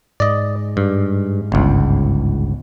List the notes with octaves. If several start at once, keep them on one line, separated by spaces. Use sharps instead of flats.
G#2 D5 D#5
G2
G1 C#2